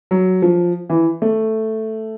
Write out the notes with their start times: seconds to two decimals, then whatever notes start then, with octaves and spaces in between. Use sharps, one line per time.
0.11 F#3
0.42 F3
0.90 E3
1.22 A3